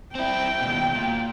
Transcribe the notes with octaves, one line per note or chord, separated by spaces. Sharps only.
C4 E4 G5
D#2 B2
A#2